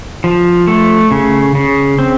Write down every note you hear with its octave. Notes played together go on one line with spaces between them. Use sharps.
F3
A3
C#3
C#3
C4